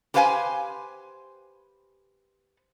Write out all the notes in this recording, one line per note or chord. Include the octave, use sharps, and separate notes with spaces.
G4 B4 C5 F5 G5 G#5